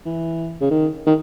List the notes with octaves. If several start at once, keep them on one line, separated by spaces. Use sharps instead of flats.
E3
C#3
D#3
D#3